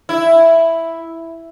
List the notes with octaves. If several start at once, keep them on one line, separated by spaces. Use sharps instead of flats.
E4